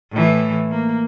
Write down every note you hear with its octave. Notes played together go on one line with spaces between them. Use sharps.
A2 E3
A#3